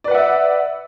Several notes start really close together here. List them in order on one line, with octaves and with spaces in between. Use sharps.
D5 B4 F#5 E5